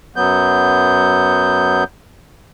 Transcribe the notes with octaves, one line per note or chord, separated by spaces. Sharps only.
F#2 F#3 B3 G6